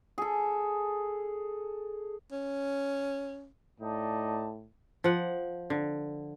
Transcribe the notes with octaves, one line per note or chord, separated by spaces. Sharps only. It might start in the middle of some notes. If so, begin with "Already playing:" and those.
G#4 A4
C#4
A2 D#4 D5 A5
F3 F#5
D3